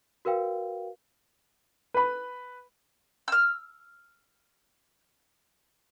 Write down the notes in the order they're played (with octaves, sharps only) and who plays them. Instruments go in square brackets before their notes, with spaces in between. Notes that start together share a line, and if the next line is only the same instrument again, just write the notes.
[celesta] F#4 A#4 B4 F5 G5
[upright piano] B4 B5
[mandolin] E6 F6